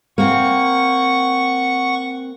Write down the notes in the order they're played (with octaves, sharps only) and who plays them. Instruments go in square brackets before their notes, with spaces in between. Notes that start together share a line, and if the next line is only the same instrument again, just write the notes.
[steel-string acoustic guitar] A#3 C4 [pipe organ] F#5 C#6